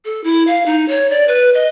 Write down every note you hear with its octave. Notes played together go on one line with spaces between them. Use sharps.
A4
E4
F5
D#4
C#5
D5
B4
D#5